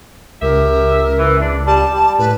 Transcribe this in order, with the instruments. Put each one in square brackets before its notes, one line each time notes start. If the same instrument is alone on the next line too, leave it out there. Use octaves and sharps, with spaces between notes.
[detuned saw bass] C#2 [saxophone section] G4 E5 [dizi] A#4
[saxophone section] E3
E2 D4
[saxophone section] G3 [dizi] A5
[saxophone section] G3
[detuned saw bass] A2 [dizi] B4